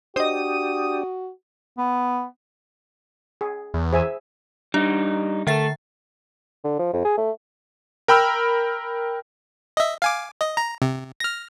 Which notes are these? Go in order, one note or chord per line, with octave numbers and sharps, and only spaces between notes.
D4 F#4 G4 C5 D#5 D#6
B3
G#4
E2
G#4 C5 E5 G#5
G3 D4 D#4
D3 A3 A4 E5 A6
D3
F3
F2
G#4
A3
A#4 G5 B5 E6 F6
D#5 E5
F5 G#5 D6
D#5
A#5
C3
F6 A#6